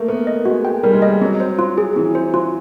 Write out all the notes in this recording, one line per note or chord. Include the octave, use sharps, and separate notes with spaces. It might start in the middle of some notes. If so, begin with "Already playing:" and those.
Already playing: A3 A#3
B3 A#4
D#5
G#3 F#4
G5
G3 A#4
G#3
G3 D#5
F#3 C4
C5
F4
G#4
E3 C4
C5
F4